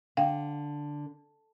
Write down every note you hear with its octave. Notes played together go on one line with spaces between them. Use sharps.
D3 F5 G5